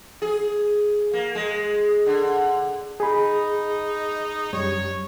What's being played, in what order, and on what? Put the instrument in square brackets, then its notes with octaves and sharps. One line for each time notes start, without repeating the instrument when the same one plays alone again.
[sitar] G#4
A#3
G#3
D3
[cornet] D#4 [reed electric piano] G#4 B5
[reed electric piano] F#2 G3 [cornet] C#5